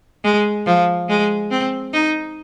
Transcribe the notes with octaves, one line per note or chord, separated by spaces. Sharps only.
G#3
F3
G#3
C4
D#4